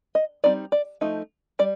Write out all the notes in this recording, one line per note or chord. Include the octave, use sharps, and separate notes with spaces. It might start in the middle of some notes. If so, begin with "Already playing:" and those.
D#5
G3 C4 D#4 D5
D5
F3 A3 D#4
G3 D5